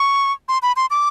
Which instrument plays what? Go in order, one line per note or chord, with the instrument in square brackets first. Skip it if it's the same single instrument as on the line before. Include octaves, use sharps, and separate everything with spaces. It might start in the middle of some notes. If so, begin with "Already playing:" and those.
Already playing: [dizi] C#6
C6
B5
C6
D6